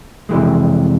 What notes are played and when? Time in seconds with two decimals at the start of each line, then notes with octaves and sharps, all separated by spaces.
0.29 F2 C3 E3 G#3